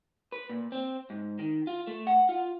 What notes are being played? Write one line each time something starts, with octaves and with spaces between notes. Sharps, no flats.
B4
A#2
C4
G#2
D#3
F4
A3
F#5
F4